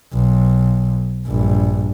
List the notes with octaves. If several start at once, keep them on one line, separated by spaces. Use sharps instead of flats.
B1
A#1 G2